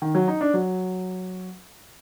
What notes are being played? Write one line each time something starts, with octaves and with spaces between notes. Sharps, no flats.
D#3
F#3
D#4
D4
F#3